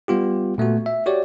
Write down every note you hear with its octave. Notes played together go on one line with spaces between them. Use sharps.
G3 B3 F4 G4
A#2 A3 B3 F#4
E5
F#4 G4 C#5 D5